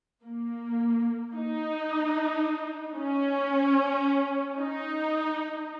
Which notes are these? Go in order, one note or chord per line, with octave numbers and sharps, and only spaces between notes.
A#3
D#4
C#4
D#4